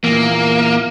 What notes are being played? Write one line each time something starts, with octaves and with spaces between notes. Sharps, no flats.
E2 A#2 A#3